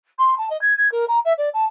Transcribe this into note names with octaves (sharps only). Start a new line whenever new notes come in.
C6
A5
D#5
G#6
G#6
A#4
A#5
E5
D5
A5